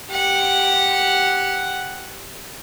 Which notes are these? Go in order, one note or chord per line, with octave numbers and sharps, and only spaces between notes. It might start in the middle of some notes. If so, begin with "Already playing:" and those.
G4 F#5